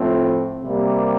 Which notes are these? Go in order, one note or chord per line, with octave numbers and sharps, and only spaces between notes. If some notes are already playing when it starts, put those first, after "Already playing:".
Already playing: A2 F3 C4
C3 G3 A#3